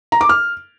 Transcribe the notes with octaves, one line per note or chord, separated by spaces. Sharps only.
A#5
D6
F6